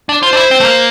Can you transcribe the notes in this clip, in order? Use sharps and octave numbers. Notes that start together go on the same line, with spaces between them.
D4
F4 C5
D4
E4
C4
A3
A#3